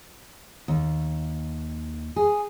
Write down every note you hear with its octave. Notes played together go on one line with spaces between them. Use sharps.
D#2
G#4